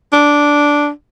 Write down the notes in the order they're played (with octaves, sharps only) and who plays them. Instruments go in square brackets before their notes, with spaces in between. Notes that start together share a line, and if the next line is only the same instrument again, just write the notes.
[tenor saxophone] D4